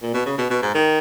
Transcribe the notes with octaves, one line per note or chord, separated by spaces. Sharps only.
A#2
B2
C#3
B2
B2
G#2
D#3